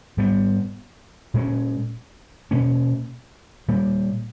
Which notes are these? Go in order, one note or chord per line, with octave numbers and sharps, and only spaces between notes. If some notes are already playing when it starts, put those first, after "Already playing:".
G#2 G3 B3
A#2 G#3 C#4
B2 A#3 C#4
A#2 G3 A#3